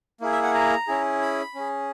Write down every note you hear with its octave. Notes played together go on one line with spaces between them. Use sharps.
A#3 E4 G#4
E5
F#5
A#5
C#4 E4 G#4
B5
C#4 G#4